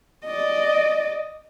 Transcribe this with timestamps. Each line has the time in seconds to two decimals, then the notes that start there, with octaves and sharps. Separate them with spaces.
0.25 D5 D#5